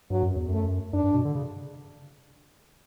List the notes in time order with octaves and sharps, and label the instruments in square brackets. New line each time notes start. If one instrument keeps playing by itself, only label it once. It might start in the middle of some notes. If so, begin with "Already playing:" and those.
[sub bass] G2 [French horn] F#3
[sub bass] F#2
E2
[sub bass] F#2 [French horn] A3
[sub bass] F#2 [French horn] D4
[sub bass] G2
B2
D3
C#3